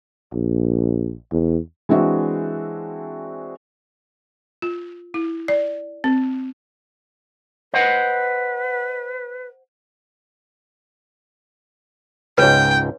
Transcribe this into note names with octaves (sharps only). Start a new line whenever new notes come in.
A#1
E2
E3 G#3 C4 D4 F#4 E5
F4
E4
D5
C4
B4 C5 D#5 F#5
C#2 G#2 B4 C#5 G5